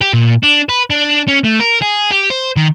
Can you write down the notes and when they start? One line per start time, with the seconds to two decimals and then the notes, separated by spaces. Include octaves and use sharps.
0.01 G4
0.13 A#2
0.43 D4
0.69 B4
0.90 D4
1.28 C#4
1.44 A3
1.60 A#4
1.82 G#4
2.11 G4
2.30 C5
2.56 D#3